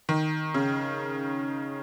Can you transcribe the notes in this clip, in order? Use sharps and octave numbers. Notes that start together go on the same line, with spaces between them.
D#3
C#3